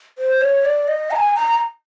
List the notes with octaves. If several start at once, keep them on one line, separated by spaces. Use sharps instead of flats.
C5
C#5
D5
D#5
A#5
G#5
A#5